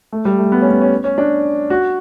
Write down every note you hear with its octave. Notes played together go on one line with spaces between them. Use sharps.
A3
G3
A3
B3
C#4
B3
C#4
C#4
D4
F#4